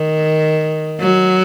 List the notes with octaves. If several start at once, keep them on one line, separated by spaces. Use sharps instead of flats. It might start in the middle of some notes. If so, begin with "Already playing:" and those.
Already playing: D#3
F#3